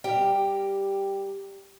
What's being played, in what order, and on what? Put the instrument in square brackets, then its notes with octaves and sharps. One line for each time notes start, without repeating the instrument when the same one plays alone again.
[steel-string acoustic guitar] G3 G4 A#4 G5 A#5